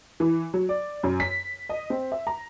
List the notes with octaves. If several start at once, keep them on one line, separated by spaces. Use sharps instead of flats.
E3
F#3
D5
F#2
B6
D#5
C4
E5
A#5